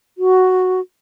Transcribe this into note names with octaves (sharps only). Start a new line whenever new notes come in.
F#4